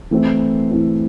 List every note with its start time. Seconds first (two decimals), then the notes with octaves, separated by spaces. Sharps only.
0.11 E3 A3 C4 E4
0.71 E3 A3 C4 E4